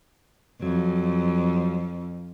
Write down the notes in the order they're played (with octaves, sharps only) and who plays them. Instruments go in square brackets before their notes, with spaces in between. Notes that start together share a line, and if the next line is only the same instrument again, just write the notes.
[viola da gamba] F2 [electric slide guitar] F#3